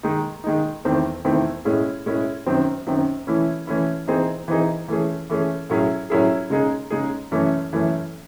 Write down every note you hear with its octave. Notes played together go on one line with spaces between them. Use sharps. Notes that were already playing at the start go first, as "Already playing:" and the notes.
D#3 G#3 D#4
D#3 G#3 D#4
E2 D#3 A3 C4 E4
E2 D#3 A3 C4 E4
A2 G#3 C#4 E4 G#4
A2 G#3 C#4 E4 G#4
F#2 D#3 F#3 C4
F#2 D#3 F#3 C4
E3 A3 C#4 E4
E3 A3 C#4 E4
E3 C4 D#4 G#4
E3 C4 D#4 G#4
E3 A3 C#4 G#4
E3 A3 C#4 G#4
A2 F#3 C#4 E4 G#4
A2 F#3 C#4 E4 G#4
C#3 G#3 D#4 G#4
C#3 G#3 D#4 G#4
F#2 E3 A3 C#4
F#2 E3 A3 C#4